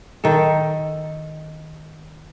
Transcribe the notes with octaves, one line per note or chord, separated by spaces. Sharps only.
D#3 A4